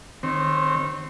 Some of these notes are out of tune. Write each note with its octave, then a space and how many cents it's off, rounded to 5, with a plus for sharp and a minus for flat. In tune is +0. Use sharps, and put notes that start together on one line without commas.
D#3 -30 C4 +0 C#5 -25